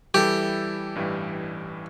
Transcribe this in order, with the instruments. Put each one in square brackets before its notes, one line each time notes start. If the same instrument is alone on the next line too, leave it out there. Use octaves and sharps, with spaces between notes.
[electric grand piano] E3 G3 E4 A4 E5 [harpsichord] G4
[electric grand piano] A1 G2 E3 G3